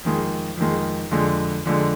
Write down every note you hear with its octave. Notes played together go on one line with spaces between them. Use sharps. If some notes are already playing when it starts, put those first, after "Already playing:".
F2 D#3 G#3
F2 D#3 G#3
F2 D3 G#3
F2 D3 G#3